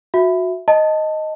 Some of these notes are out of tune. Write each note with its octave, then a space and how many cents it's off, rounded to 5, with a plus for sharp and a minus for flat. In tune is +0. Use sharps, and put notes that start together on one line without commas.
F#4 -20 E5 +0
D#5 +0 A5 +10